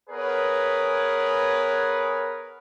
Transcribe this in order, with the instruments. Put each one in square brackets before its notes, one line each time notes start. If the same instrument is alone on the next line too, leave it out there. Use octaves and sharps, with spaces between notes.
[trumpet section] B3 G#4 A#4 B4 C#5